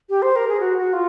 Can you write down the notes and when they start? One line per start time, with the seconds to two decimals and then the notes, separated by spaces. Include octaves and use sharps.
0.10 G4
0.22 C5
0.36 A#4
0.48 G#4
0.60 F#4
0.78 F#4
0.93 F4